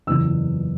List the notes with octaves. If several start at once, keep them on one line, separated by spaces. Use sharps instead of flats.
F#1 E2 C#3 E3 E6